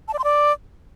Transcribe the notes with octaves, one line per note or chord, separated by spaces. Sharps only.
A5
D5
C6
D5